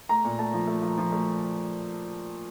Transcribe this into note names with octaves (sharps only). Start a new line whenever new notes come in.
A3 A#5
A#2
A3 A5
F3
A3
F3
F3
A3